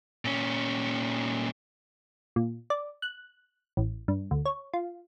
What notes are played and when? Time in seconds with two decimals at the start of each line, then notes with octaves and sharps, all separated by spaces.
0.25 A#2 C#4
2.36 A#2
2.70 D5
3.02 F#6
3.77 A1
4.08 G2
4.31 D2
4.45 C#5
4.73 F4